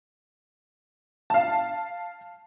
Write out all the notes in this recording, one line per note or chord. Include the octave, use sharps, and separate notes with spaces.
F5 A5